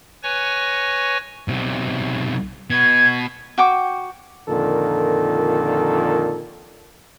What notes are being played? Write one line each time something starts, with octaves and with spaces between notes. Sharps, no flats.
B4 C#5 G#5 C#6 A#6
B1 C3
B2 B3 G#6
F#4 G5 D6
F2 A#2 D3 D#3 A4 A#4